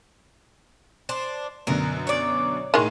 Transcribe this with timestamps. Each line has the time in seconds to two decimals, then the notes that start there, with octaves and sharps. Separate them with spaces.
1.09 D4 C5
1.67 F#2 B2 D3 A#4
2.07 C#5 D5
2.74 A2 D#3 G#3 C6 D#7